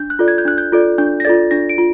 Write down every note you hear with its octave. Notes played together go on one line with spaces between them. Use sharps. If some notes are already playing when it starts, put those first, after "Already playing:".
Already playing: D4 G6
F#6
F4 A4 D5
G#6
G6
D4 F#6
G6
F4 A4 D5
D4 G6
A#6
F4 A4 D5 A6
D4 A#6
D7
F4